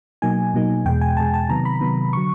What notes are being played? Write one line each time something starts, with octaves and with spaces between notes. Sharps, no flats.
B2 F#3 A#3 D#4 G#5
B2 F#3 A#3 D#4
E2 B2 G#3 G5
G#5
E2 B2 G#3 A5
A5
C3 D#3 F#3 B3 A#5
B5
C3 D#3 F#3 B3
D3 F#3 C#6